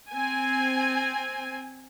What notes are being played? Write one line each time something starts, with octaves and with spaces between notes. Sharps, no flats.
C4 G#5